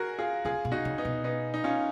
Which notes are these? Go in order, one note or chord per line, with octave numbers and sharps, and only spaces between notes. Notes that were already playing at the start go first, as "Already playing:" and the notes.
Already playing: F#4 G#4 A#4
F4 G#4
C#3 F4 G#4
B2
D#4 F#4
C#3
B3 D#4
B2
B3 D#4
D#4
C#4 F4